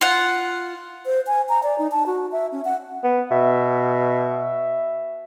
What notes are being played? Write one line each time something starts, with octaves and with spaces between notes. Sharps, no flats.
F4 F#5
C5
G#5
A#5
D5
D#4
A5
F#4
E5
C#4
F#5
B3
B2 E5